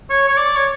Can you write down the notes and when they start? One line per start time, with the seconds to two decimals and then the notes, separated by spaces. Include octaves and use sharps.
0.10 C#5
0.27 C#5
0.37 D5
0.56 C#5